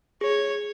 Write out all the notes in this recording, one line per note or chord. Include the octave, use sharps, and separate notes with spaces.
G#4 C#5